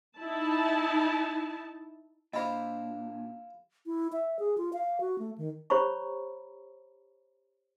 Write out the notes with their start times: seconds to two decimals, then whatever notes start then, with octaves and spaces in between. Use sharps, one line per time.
0.19 D#4 E4 A5
2.33 A#2 D4 E4 F4 C5 D#5 B5
3.86 E4
4.12 E5
4.39 G#4
4.57 F4
4.73 F5
5.00 F#4
5.19 A3
5.38 D#3
5.70 G4 C5 C#5 A#5 B5 C#6